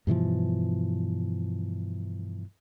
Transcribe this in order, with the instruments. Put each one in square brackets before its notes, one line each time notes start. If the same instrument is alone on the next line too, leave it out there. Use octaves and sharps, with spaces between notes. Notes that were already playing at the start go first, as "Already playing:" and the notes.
[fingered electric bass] G2 B2 E3 F3